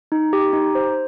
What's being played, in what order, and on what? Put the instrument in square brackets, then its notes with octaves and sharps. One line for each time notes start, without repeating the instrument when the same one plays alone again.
[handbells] D#4
G4
D#4
C5